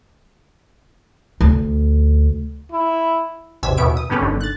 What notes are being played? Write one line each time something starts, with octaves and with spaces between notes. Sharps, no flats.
D2
E4
A1 E2 C3 E6 G#6 B6
D#2 B2 E3 B3 E5 D7
D#6
G2 D3 B3 C#4 G4 B4
G1 D3 D#3
F#6 A6